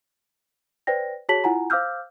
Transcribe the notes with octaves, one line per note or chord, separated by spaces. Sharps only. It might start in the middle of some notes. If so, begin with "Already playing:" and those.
B4 C5 D5 G5 A#6
F#4 G#4 C#5 A5 B6 F#7
E4 F4 F#5 G#5 A#5
C5 F5 D6 E6 F6 G6